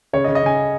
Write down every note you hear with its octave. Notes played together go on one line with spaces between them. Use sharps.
C#3 C#5
D#5
C#3
D#5
C#3 G#5